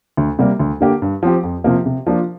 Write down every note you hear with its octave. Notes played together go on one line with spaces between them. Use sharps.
D2
C3 G3 A#3
D2
D3 A#3 G4
G2
F3 C4 G4
F2
C3 F3 A#3
C3
F3 A#3 D4 F4